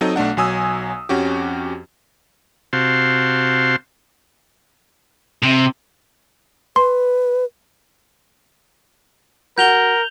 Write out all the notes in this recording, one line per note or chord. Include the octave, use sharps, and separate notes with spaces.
F#3 C4 D#4 A4 D#5
B1 A3 D4 F#5
B1 F#3 G#5 D#6 E6
F2 C#4 F#4 G4
C3 C4 F#4 F5 A5 C6
C3
B4 C6
F#4 A#4 G6 F7 G7